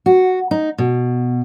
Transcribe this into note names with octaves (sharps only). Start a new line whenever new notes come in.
F#4
D#4
B2